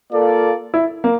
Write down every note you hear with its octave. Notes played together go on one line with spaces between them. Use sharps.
A#3 F4 A4 D5
E4
A#3